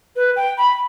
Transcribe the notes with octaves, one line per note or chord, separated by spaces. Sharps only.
B4
G5
B5